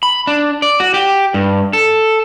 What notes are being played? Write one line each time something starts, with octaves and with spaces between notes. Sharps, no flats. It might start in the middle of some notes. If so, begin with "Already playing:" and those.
B5
D4
D5
F#4
G4
G2
A4